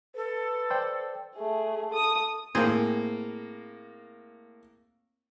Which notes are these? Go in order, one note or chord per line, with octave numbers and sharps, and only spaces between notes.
A4 B4
C5 D5 G5
A3 G#4
A4 D#6
A2 A#3 C4 G#4